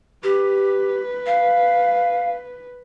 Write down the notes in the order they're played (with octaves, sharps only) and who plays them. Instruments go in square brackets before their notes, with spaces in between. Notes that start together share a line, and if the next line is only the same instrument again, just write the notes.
[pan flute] G4 [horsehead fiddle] B4
[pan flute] F5